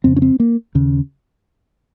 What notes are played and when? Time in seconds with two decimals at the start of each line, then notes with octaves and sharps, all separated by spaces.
0.04 F2 C#3 C4
0.16 C#4
0.22 C4
0.40 A#3
0.75 D#2 C#3